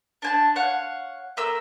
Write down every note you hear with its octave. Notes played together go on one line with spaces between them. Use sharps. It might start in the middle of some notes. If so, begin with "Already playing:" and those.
D4 G#5 A5
C#5 F5 F#5
A3 A#4 E6